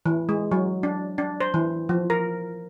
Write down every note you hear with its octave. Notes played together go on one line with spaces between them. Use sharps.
E3
G#3
F#3
D4
D4
C5
E3
F3
A#4